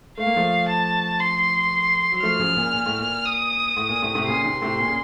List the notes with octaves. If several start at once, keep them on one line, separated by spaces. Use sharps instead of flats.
A3 F5
A#3
F3 A3
A5
C6
F#3
F3 A3 F6
F#3
C#3 F3
A#2 C#3
A#2
A2
A#2
D#6
A2
A#2
A2 C3
A2 C3
A#2 C#3 C6
C3 D#3
A2 C3
A#2
C#3